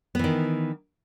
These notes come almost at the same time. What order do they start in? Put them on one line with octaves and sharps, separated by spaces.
B3 E3 D#3